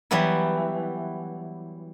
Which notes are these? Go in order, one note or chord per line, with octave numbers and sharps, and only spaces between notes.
E3 F#3 G3 B3 E4